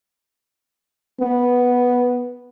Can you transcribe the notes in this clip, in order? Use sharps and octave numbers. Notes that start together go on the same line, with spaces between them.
B3